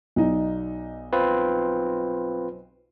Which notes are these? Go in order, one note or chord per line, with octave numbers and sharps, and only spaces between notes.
B1 D#4 D5
C4 F4 B4